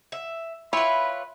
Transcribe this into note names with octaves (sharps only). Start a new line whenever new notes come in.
E5
E4 F4 B4 C#5 E5 G5 B5